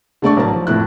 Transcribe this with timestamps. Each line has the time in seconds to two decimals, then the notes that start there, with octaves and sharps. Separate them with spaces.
0.22 D3 A3 D5 C#6
0.36 A1 F#3 A#4 A5
0.53 F3
0.67 F2 A2 E4 F#6